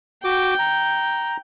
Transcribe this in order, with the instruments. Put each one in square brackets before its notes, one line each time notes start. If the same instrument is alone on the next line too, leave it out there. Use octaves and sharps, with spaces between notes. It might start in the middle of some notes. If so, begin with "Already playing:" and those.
[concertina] F#4 D6 [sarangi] G5
[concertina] A#5